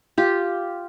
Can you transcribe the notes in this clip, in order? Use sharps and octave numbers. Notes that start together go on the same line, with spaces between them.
F4 G4